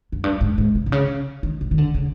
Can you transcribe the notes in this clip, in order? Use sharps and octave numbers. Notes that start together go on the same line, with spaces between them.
F#2
G2
G#2
G#2
C3
C3
C#3
D#3
C#3
D#3
D3
C#3